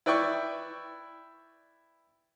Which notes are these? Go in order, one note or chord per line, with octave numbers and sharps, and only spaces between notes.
E4 B4 D5 G5 C#6